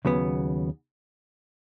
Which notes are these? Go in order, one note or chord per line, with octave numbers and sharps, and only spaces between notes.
D#2 C#3 F#3 B3